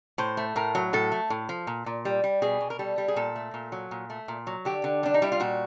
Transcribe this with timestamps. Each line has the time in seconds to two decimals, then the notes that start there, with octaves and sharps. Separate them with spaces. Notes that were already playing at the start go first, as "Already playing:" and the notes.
0.18 A2 C5
0.37 A3
0.56 A2 A#4
0.75 F#3
0.93 A2 A4
1.12 A3
1.30 A2
1.49 F3
1.67 A#2
1.86 A#2
2.05 G3
2.24 G3
2.42 B2 G#4
2.60 B2
2.70 A#4
2.79 G3 A4
2.98 G3
3.08 G#4
3.16 A#2 A4
3.36 A3
3.54 A#2
3.72 F#3
3.91 A#2
4.10 A3
4.28 A#2
4.47 F#3
4.65 D3 G4
4.84 D3
5.03 G3 D4
5.14 D#4
5.22 G3 E4
5.32 F4
5.40 A#2 F#4